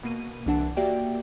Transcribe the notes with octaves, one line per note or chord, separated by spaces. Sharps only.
B2 A#3 D#7
C2 E3 D4 F#5 A5
A#3 F#4 G4 D5 E5 G5